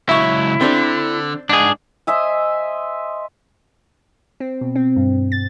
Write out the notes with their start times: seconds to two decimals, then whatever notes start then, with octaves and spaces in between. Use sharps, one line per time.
0.09 C#2 F#3 E4 E5 C#6
0.61 D3 C4 D4
1.49 G#2 D4 G#4
2.07 C5 D#5 E5 G#5
4.40 C4
4.61 B2
4.76 C4
4.97 G2
5.32 A6